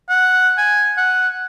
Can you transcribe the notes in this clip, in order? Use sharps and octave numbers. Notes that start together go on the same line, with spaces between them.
F#5
G#5
F#5